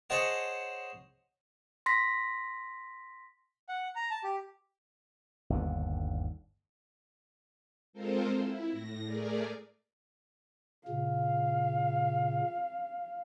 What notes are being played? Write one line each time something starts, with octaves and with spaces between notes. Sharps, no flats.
G#4 C5 C#5 D#5 F#5 A5
C6 A#6 B6
F#5
A#5
A5
G4
G1 D#2 D3
G#3 C4 F4 A4 A#4 C5
E4
A2 A#6
A3 G#4 A#4 D5
A#2 C#3 F5